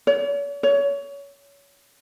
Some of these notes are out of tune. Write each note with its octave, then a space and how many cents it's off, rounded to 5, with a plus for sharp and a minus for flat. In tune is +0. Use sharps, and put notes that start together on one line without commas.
C#5 +45
C#5 +25